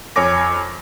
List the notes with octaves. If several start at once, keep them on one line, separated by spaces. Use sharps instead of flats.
F2 C#5 G#5 D6 A#6